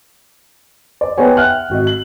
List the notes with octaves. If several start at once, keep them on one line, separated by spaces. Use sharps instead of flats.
D5
B3 D#4 G4 C#5 F#5 G#5
E5 F#5 G5 F6 F#6
G#1 F#4 D#5
F#7